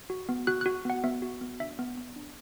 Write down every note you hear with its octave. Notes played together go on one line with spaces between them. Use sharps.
F#4
B3
F#4 F#6
F#4 F#6
B3 F#5
B3 E5
F#4
B3
D4 E5
B3
B3
D4